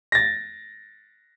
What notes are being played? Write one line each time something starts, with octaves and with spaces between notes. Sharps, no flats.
A6 A#6